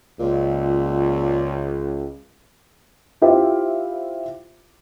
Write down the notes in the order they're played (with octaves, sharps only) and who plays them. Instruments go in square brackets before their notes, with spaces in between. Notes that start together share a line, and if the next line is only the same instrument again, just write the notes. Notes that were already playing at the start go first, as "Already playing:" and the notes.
[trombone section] C#2 [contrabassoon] A#2
[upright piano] E4 F4 G4 C5 E5 F5